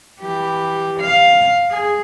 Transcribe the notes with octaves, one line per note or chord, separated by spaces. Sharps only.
E3 G4
F5
G#4